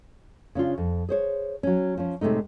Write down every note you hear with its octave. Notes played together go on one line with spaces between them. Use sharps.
C#3 C#4 D4 F4
F2
G#4 C5 C#5
F#3 C#4
F3 C#4
A2 C3 G#3 A3 D#4